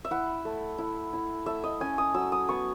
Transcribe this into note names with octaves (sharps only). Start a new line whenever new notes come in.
E5
E4 F#5
A3
E4
E4
A3 E5
D#5
C#4 G#5
D#6
F#3 E6
D#6
B3 C#6